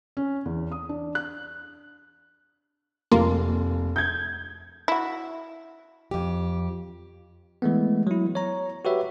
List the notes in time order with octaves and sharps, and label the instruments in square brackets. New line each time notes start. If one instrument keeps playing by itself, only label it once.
[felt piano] C#4
E2
D#6
D4
F#6
[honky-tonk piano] F1 [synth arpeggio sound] A#3 F4
[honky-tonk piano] G6 G#6
[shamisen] E4 F#4
[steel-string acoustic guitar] F2 G4
[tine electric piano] E3 G#3 A3 B3
F#3 E4
C#5 A#5
F#4 G4 B4 C#5 E5